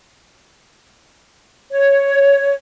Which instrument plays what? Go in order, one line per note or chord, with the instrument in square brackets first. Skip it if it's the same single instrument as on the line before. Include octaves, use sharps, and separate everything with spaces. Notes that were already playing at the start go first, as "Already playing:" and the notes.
[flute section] C#5